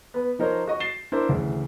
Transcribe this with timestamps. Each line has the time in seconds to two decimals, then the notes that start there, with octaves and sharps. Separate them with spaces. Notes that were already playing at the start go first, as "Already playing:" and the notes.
0.14 B3 B4
0.39 F3 D#4 A#4 C5 C#5
0.68 F#4 D#5 C#6
0.80 A6 C7 E7 G7
1.12 D4 E4 A#4 C5 D5
1.29 D2 C#3 E3